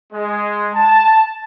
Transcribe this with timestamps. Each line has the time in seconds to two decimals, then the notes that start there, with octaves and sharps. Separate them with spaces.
0.13 G#3
0.75 A5